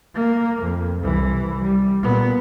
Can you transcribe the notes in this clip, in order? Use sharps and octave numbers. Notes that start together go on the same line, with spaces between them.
A#3
F2
C2 E3
G3
A#2 B3